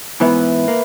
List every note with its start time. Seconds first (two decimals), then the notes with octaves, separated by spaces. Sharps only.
0.20 G#2 E3 B3 B4 E5
0.68 A#3